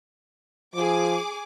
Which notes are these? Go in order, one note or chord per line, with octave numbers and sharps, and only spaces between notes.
F3 G#4 D6